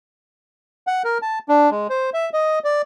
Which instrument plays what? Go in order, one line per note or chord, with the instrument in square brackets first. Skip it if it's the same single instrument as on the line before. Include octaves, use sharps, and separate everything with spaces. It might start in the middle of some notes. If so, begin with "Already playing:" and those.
[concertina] F#5
A#4
A5
D4
G#3
C5
E5
D#5
D5